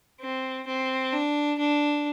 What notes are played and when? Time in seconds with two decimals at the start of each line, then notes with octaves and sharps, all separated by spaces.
0.21 C4
0.67 C4
1.12 D4
1.59 D4